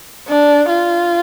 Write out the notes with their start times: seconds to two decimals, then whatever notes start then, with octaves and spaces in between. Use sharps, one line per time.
0.28 D4
0.70 F4